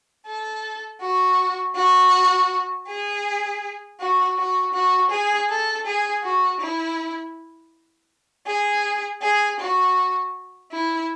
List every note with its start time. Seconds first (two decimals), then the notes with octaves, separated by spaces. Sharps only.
0.25 A4
1.00 F#4
1.75 F#4
2.87 G#4
3.99 F#4
4.37 F#4
4.73 F#4
5.10 G#4
5.49 A4
5.85 G#4
6.23 F#4
6.60 E4
8.47 G#4
9.22 G#4
9.60 F#4
10.71 E4